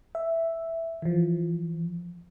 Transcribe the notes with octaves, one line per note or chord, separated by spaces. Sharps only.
E5
E3 F3